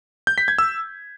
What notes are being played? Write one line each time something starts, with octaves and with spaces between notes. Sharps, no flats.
G6
B6
G#6
E6